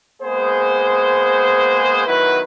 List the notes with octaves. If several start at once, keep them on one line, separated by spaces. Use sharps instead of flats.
G#3 A#3 B3 G#4 C5
D#3 F#3 B3 E4 B4